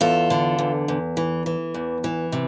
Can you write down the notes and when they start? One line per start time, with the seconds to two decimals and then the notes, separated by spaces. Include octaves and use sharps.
0.01 E2 F4 A4
0.30 D3
0.58 E2
0.88 E2
1.17 E3
1.46 E3
1.74 E2
2.04 E3
2.32 C3